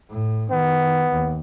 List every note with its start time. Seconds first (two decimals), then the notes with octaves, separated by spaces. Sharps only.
0.10 A2
0.51 D#3 B3
1.11 D#2